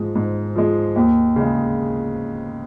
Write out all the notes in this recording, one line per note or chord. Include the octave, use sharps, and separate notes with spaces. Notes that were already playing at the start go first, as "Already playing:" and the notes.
Already playing: G#2 F3 G#3
G#2
F3 G#3
D#2
C#3 G#3